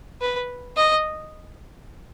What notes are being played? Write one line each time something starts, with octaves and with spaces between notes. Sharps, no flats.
B4
D#5